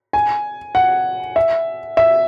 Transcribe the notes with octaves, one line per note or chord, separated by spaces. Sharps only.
G#5
F#5
E5
E5